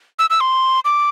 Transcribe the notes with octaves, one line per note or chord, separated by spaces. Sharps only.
E6
E6
C6
D6